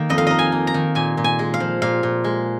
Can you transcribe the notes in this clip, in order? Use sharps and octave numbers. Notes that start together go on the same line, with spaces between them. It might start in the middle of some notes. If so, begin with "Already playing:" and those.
Already playing: D#3 A#3 D#4
F2 D#5
F5
D#4 D#5
G#5
A#3
A#5
D#3
A#2 G#5
A#2
G#5
G#3
F5
F3
A#2 F5
A#2
G#3